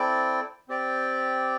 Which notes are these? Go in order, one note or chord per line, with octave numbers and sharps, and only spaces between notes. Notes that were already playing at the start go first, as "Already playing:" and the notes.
Already playing: C4 E4 A4 D5 G5
C4 G4 D5 G5